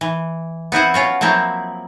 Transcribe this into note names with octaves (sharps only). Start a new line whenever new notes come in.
E3
B3 C4 E4 F#5
C#4 F4 F#4
F3 F#3 A#3 C4 E4